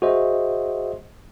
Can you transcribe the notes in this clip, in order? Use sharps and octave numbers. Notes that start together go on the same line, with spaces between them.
F#4 G#4 C5 D#5 E5